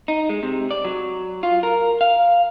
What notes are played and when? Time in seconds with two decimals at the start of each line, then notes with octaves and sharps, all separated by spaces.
0.08 D#4
0.29 G#3
0.43 C3
0.71 D5
0.84 F#3
1.43 F4
1.63 A#4
2.01 F5